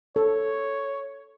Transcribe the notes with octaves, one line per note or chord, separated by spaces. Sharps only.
A4 C#5